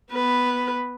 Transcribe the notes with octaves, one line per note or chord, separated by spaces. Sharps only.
B3 B4